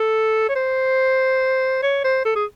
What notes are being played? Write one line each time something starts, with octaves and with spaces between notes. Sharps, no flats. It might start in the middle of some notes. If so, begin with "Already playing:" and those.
Already playing: A4
C#5
C5
C#5
C5
A4
G#4